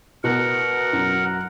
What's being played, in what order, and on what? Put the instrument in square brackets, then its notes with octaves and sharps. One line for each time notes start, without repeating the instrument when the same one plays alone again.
[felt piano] B2 B3 [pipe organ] A#4 F#5
[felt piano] F#2